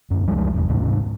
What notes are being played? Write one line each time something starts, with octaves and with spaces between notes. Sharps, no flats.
D#1 F#2
C#2 F3 G3 G#3
G1 E2
D2 G#2 C3